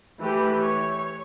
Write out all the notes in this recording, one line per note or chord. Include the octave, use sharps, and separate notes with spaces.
E3 A3 G4 B4
C#5